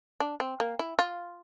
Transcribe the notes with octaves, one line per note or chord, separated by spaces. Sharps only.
D4
C4
A#3
E4
F4